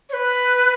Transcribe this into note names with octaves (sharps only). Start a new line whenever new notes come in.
C#5
B4